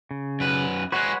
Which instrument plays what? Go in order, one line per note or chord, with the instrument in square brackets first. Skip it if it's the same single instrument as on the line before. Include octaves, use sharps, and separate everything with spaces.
[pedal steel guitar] C#3
[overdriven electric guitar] F#2 B4
[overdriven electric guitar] G#3 F#4 [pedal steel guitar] B4 C#5 F#5